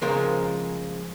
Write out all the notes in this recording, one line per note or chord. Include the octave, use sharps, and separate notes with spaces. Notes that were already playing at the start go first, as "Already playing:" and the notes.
C#3 F3 G#3 A#3 A#4 C5